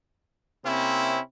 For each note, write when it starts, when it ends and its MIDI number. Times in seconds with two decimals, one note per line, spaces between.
0.65 1.19 48
0.65 1.19 58
0.65 1.19 60
0.65 1.19 61
0.65 1.19 64